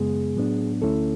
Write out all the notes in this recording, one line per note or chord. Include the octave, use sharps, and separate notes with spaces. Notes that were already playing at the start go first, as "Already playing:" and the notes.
Already playing: F#2 C#3 G#3 B3 G#4
A2 F#3 B3 D4
D2 D3 A3 C#4 E4 A4